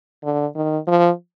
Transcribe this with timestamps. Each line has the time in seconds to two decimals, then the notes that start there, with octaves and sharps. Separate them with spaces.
0.24 D3
0.55 D#3
0.87 F3